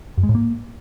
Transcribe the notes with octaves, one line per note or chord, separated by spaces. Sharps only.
F#2
G#3
A2
A#3